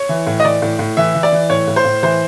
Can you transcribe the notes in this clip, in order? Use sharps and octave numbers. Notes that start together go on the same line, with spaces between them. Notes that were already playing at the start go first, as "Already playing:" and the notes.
Already playing: C#5
E3
A2
D#5
E3 D5
A2
A2
E3 E5
E3
D5
E3
A2 C#5
A2
C5
A2
E3 C5